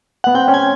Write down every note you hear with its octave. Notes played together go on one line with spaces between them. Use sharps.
B3 F#5
C4 G5
C#4
G#5